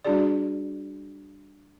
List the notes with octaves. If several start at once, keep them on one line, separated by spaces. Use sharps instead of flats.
G3 D4 E4 F#4 G#4 D5